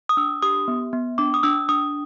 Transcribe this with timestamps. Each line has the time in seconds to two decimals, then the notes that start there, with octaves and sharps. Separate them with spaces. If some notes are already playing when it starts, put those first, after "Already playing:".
0.09 D#6
0.17 D4 E6
0.42 G4 D#6
0.68 B3
0.93 B3
1.18 D4 D6
1.34 D#6
1.43 D4 E6
1.69 D4 D#6